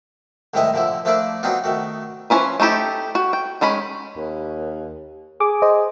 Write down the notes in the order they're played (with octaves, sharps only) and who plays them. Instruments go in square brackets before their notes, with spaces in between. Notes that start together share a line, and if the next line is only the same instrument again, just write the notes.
[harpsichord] C2 A2 D#3 G#3 E4 D#5
A#2 D3 F3 E4
F3 A3 A#3 D4 E4 D5
F#3 B3 C4 D4 D#4 F4
D#3 A3 F#4
[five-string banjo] F3 G#3 C#4 E4 B4
A3 D#4 E4 G4 A4
F#4
G5
D#3 G#3 C#4 B5
[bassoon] D#2
[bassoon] G#4 [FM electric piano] D6
[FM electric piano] C5 D#5